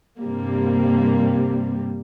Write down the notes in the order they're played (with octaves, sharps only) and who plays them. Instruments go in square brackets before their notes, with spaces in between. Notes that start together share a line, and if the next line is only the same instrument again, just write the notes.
[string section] G2 C3 G3 A#3